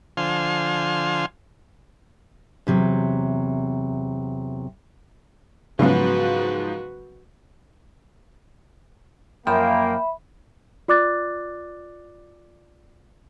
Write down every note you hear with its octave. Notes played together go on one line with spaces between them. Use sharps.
D3 F3 C5 F5 G#5 C6
E2 C3 F#3
G#2 C#3 F3 F#3 B3 F#4 B4
F#2 F3 A#3 E5 G5 B5
F4 D5 D6 F#6 A6